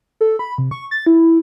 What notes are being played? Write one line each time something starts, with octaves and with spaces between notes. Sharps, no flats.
A4
B5
C3
C#6
A6
E4